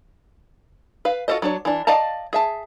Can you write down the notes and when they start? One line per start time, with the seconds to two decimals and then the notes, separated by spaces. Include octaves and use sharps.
1.05 B4 F5
1.28 F4 F#4 A4 C5 D#5
1.42 F#3 D4 C#5
1.65 E3 D4
1.87 D5 D#5 F5 A5 A#5
2.33 G#4 E5 A5